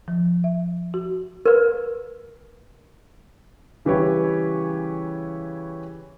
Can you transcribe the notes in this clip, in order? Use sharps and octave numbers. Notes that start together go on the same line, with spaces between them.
F3
E5
F#4
A#4 B4
C#3 E3 G3 G4 B4 C#5